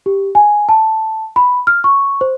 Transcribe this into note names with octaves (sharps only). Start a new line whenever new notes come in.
G4
G#5
A5
B5
F6
C#6
C5